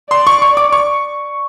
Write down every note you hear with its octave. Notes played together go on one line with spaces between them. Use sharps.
D5 C6
C#6
C#6
D6
C#6